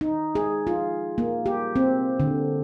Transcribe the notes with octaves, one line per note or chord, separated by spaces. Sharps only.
D#4
G#4
F4
A#3
G4
C4
D3